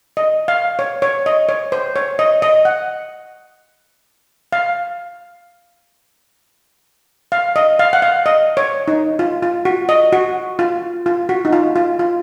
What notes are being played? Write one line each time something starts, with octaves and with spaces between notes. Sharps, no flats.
D#5
F5
C#5
C#5
D#5
C#5
C5
C#5
D#5
D#5
F#5
F5
F5
D#5
F5
F#5
F5
D#5
C#5
D#4
F4
F4
F#4
D#5
F#4
F4
F4
F#4
D#4
F4
F4
F4